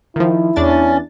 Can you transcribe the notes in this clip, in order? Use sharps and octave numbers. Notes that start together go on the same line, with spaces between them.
D#3 F3 E4
E2 C#4 D4 A6